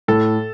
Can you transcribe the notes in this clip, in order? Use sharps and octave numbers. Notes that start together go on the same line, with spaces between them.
A2 A4